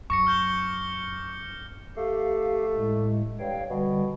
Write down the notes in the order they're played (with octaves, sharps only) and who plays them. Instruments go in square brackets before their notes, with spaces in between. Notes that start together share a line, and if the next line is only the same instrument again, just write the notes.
[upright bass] F#2 [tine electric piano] C#6 [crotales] D6 A#6 C#7
[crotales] F6 G6 G7
[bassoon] A3 [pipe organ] G4 F5
[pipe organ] A2 G#3
[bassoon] G2 [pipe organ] C#5 F5 G5
[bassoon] B2 [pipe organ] D3 G3